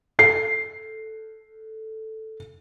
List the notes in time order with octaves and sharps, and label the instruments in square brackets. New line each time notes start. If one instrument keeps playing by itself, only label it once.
[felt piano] A4 C7